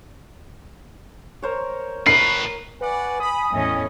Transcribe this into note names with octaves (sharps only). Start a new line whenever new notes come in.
A#4 C5 C#5
A2 A#4 B4 C#6 C7
F#4 B4 D5 F#5 G#5
B5 D#6
E2 A2 C#4 D#5